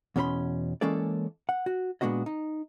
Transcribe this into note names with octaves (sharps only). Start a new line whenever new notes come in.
E2 B2 C#4 A4 B5 C6
E3 G#3 A#3 C#4 A4 D5
F#5
F#4
A#2 G#3 B3 D4 F#4 D#5
D#4